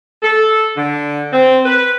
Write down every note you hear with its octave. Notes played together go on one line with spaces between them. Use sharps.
A4
D3
C4
B4